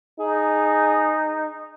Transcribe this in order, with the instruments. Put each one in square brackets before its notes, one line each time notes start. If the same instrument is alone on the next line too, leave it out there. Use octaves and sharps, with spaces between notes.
[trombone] D#4 [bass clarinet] G#4